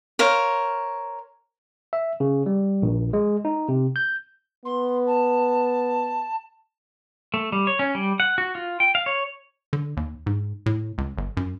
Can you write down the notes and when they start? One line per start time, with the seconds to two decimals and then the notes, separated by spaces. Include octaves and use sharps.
0.19 A#4 C5 C#5 F5
1.93 E5
2.20 C#3
2.46 G3
2.82 A#1
3.13 G#3
3.45 D#4
3.69 C3
3.96 G6
4.65 B3 C6
5.07 A5
7.34 A3
7.52 G3
7.67 C#5
7.79 C#4
7.95 G3
8.20 F#5
8.38 F#4
8.55 F4
8.80 G5
8.95 F5
9.06 C#5
9.73 D3
9.97 D#2
10.26 G#2
10.66 A2
10.98 C#2
11.18 G1
11.37 F#2